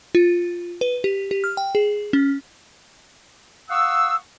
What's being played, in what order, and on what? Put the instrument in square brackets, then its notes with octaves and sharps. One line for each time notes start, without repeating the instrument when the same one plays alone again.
[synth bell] F4
B4
G4
G4
F6
G5
G#4
C#4
[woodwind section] F5 F#5 C#6 D#6 E6